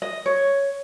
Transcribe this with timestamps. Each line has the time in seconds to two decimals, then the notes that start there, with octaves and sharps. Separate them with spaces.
0.02 D#5
0.26 C#5